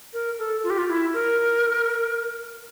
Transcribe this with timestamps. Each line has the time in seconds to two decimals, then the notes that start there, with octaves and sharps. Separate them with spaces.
0.13 A#4
0.39 A4
0.64 F4
0.70 G4
0.78 F4
0.89 E4
1.14 A#4